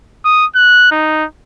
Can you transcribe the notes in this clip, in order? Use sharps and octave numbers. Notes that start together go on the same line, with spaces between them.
D#6
F#6
D#4